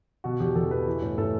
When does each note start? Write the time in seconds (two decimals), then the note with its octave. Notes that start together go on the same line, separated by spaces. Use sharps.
0.24 B2 F#4
0.40 E2 G4
0.55 E2 A4
0.71 B2 B4
0.86 E3
1.02 A2
1.18 A2 A4